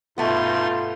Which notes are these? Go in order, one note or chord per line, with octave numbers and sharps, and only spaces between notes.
G2 B2 A3 B3 D#4 F4 C6